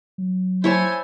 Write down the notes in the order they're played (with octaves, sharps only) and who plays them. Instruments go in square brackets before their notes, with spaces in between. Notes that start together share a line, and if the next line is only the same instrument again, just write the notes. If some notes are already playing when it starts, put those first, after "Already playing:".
[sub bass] F#3
[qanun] E4 C#5 A5 [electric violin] C5 G#5